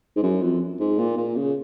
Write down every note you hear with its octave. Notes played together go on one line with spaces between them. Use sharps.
G#2
F#2
F2
G#2
A#2
A#2
C#3